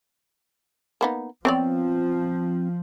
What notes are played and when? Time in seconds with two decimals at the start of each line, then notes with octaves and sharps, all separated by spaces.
1.01 A#3 B3 D#4
1.45 F3 B3 C4 C#5 D5